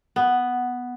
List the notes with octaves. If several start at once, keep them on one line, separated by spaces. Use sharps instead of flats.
B3